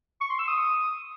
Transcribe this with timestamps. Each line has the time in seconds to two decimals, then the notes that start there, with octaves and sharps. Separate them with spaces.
0.21 C#6
0.30 C6
0.39 E6
0.48 D#6